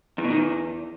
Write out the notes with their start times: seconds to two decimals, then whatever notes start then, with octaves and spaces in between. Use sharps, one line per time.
0.18 E2
0.24 B2
0.30 D#3
0.36 E2